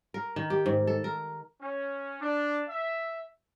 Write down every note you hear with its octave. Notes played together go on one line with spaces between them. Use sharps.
A#4
D#3
G4
G#2
A4
A#4
C#4
D4
E5